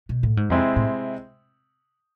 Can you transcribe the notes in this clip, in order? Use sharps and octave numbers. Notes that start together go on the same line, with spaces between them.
B2
A2
G#2
F2 C3 G#3 C4 E4
A2